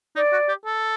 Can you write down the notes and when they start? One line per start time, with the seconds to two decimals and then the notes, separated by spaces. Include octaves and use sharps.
0.16 D#4 D5
0.32 F#4
0.49 G4
0.65 A4